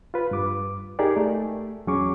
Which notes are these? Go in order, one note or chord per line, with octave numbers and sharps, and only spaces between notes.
F4 B4
G2 D6
D#4 G4 G#4 A#4 D5
A3
E2 F#3 C#4 G#4 C#6 D6